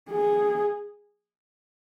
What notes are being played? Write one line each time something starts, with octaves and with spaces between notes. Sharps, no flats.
G#4